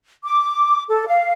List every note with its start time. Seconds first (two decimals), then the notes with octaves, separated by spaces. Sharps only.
0.23 D6
0.89 A4
1.07 F5